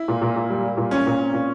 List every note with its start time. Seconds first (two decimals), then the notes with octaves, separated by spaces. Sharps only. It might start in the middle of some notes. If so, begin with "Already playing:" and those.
Already playing: E4
0.08 A#2
0.22 A#2
0.36 A#2
0.50 G3
0.64 G3
0.77 A#2
0.91 A#2 C#4
1.06 A#2
1.20 C4
1.34 A#2